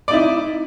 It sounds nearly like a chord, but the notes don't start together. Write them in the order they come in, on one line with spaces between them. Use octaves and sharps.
D5 D#4 E4